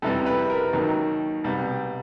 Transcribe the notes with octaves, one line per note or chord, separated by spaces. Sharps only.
F2 C3 E3 G3 A4
B4
A#4
D#2 D#3 F#3
C2 B2 G3